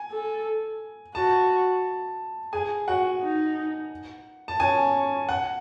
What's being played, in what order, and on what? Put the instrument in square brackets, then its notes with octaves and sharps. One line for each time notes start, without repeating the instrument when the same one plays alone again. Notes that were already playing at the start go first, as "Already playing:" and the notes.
Already playing: [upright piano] G#5
[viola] A4
[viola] F#4 [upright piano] A5
[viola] G#4 [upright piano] G#5
[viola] F#4 [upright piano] F#5
[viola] D#4
[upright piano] A5
[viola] C#4 [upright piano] G#5
[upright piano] F#5